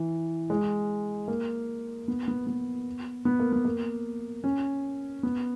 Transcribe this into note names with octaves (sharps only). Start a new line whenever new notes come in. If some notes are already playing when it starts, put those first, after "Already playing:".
Already playing: E3
G#3
A#3
B3
B3
B3
B3
A#3
B3
A#3
C#4
B3